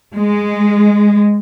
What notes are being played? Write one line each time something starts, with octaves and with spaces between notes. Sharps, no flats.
G#3